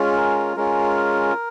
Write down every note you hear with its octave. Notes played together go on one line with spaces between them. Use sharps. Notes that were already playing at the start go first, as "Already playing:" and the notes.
Already playing: G#3 C#4 F4
A#4
G#3 C#4 F4 A#4